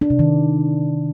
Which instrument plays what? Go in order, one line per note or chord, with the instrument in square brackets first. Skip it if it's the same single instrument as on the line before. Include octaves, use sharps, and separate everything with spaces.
[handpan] D4
C3
D#3